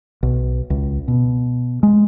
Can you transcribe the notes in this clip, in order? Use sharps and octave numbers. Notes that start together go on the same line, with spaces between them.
B1
C#2
B2
G#3